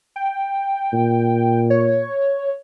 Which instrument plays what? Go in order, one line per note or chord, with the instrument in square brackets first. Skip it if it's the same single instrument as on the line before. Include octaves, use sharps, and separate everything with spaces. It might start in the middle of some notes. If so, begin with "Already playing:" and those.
[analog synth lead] G5
[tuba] A#2
[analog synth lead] C#5